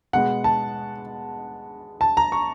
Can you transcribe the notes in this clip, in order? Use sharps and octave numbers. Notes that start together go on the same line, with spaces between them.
B2 G#3 B3 F#5
A5
A5
A#5
C#6